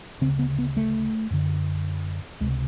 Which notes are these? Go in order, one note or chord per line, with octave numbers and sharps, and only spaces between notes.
D2 C#3 C4
B3
B3
A3
F#2 D3
C#2 C3 G#3